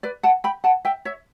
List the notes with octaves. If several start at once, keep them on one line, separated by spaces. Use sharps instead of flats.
B4 D5
F#5 A5
G5 B5
F#5 A5
E5 G5
C#5 E5